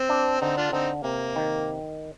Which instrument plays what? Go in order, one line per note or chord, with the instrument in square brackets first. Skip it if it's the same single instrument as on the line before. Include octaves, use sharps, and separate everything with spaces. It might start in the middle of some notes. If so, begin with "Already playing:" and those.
Already playing: [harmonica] C4
[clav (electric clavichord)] D4
[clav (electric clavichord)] D3 [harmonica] C4 D#4
[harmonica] D4 F4
[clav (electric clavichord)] D3 [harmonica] C4 D#4
[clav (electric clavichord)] C3 [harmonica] A#3
[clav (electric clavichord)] D#3